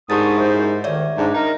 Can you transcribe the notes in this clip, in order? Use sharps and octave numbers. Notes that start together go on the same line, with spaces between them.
G#2 D4 G4 A#4 C#6 D#6 A6
F#2 E4 C5
D2 D#3 C#5 D5 E5
G#2 D4
D#4 A#4